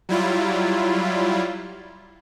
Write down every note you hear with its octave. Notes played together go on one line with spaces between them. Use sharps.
F#3 G3 E4 F4